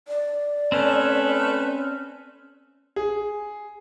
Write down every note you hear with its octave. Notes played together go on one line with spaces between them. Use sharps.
D5
A3 C4 C#4 B4
G#4